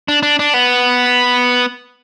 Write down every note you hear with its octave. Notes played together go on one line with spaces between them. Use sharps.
D4
D4
D4
B3